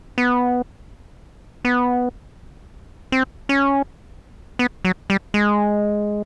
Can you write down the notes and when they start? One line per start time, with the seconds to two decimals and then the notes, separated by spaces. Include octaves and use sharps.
0.18 B3
1.65 B3
3.12 C4
3.49 C#4
4.59 B3
4.85 F#3
5.10 G3
5.34 G#3